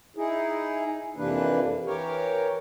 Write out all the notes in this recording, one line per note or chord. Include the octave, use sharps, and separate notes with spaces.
D#4 E4 G#4
F2 C3 E3 A#3 D4 B4
E3 G4 A#4 C#5